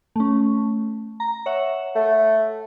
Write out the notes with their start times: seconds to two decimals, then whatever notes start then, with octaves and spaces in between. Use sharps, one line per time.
0.16 A3 C#4
1.20 A#5
1.46 C#5 E5 F#5
1.96 A3